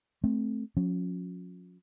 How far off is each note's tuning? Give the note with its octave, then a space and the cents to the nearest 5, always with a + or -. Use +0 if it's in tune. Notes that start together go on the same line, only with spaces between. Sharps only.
A3 -15 C4 +0
F3 +45 C#4 +0